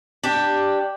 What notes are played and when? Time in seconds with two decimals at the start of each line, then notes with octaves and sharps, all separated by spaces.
0.24 D4 G4